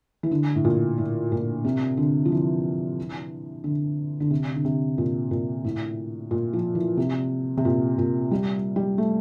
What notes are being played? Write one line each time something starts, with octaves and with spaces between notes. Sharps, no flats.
E3
D3
A2
A#2
A2
A#2
C3
D3
F3
E3
D3
D3
C3
D3
C3
A#2
A#2
A2
A#2
F3
E3
C3
C3
A#2
A#2
G3
G3
A3